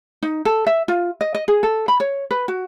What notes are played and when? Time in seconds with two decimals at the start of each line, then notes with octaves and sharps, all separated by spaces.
0.23 D#4
0.45 A4
0.67 E5
0.88 F4
1.21 D#5
1.35 D#5
1.48 G#4
1.63 A4
1.88 B5
2.00 C#5
2.31 B4
2.48 F#4